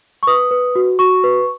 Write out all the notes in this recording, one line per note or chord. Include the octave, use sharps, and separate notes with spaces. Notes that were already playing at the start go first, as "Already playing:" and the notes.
C#6
B4 D#6
B4
F#4
F#4 C#6
B4